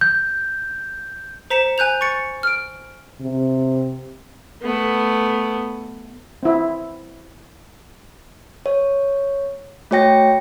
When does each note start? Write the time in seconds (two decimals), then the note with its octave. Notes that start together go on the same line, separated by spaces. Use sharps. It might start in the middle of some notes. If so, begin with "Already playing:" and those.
0.01 G6
1.50 C5 A#5 B6 C#7 E7
1.78 G#5 F#6 G6 F7
2.01 C#6 A6 C#7
2.43 F6 D7
3.21 C3
4.62 A3 B3
6.43 C4 E4
8.66 C#5
9.91 A3 F#4 C#5 G5 A#6